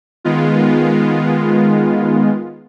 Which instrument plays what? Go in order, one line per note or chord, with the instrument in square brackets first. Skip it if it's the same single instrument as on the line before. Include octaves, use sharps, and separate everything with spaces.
[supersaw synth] D#3 G#3 B3 F4